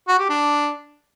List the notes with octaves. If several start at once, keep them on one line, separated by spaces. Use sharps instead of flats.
F#4
G4
D4